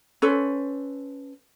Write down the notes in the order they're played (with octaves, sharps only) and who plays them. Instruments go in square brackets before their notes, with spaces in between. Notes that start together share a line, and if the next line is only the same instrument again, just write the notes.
[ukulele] C#4 A4 B4 C5